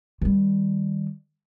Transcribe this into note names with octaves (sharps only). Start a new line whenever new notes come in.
D#3 G3